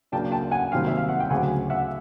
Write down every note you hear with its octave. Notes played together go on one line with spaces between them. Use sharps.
C#3 F#3 A#3 D4 G5 A5
G5 A5
F#5 G#5
C2 C3 D#3 F#3 A#3 F5 G5
E5
F5
F#5
G5
D2 C#3 F#3 F#5 G#5
E5 F#5